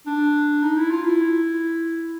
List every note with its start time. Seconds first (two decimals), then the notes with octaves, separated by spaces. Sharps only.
0.06 D4
0.62 D#4
0.77 E4
0.91 F4
1.05 E4